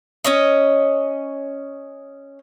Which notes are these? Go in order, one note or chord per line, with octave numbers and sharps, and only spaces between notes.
C#4 C#5 D#5